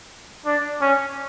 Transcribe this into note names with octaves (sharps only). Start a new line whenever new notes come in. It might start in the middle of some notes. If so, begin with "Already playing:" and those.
D4
C#4